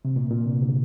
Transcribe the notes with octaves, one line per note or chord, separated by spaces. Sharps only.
C3
A#2
A#2
C3
D3